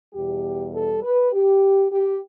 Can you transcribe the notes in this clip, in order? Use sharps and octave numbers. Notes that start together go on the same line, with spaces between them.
E2 B2 G3 G4
A4
B4
G4
G4